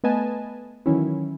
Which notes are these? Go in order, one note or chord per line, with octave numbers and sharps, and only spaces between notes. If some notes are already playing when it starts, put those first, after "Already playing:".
A3 B3 B4 D#5 G#5 A5
D#3 E3 F#3 C#4 E4